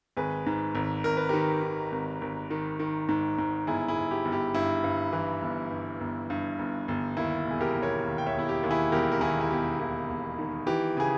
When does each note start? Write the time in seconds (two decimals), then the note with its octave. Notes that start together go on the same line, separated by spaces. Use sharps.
0.17 G#1 G#4 B4
0.46 G#2
0.75 G#1
1.04 G#1 A#4
1.17 B4
1.29 D#3 G4 A#4
1.63 D#3
1.92 G#1
2.21 G#1
2.50 D#3
2.80 D#3
3.09 G#2
3.38 G#2
3.67 G1 E4 G#4
3.88 E4 G#4
3.96 G1
4.11 G4
4.25 G1
4.32 G4
4.54 G2 E4
4.84 G2
5.13 E3
5.42 G1
5.71 G2
6.00 G1
6.30 G2
6.59 G1
6.88 G1
7.17 D#2 E4
7.47 E1 G#4
7.61 G4 A#4
7.75 E1
7.82 A#4 C#5
8.04 D#2
8.18 G5
8.27 C#5 E5
8.34 E1 E4
8.49 G4
8.63 D#2
8.70 E4 G#4
8.92 E1 G4 A#4
9.12 A#4
9.21 D#2 E4 G#4
9.41 E4
9.50 E1 G4
9.79 D#2 E4
10.09 E1
10.39 D#3
10.67 E3 G4
10.97 C#3 G#4